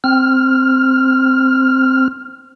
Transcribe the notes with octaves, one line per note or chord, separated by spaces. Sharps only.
C4 F6